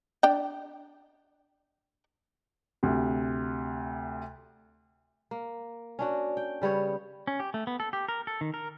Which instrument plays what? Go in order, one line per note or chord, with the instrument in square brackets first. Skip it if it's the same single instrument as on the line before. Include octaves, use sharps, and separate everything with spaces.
[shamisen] D4 D5 G5
[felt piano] D2 C3
[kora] A#3
C#4 D4 F#4
G5
C#3 G3 B3 C#5
[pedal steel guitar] C#4
G4
A3
B3
A4
G4
A#4
A4
D#3
A#4